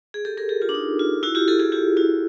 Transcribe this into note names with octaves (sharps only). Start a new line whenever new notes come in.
G#4
G4 A4
G#4 A#4
G4 A4
F4 G4
D4
D#4
F4
E4 F#4
F4 G4
G4 A4
F#4 G#4
F4 G4
E4 F#4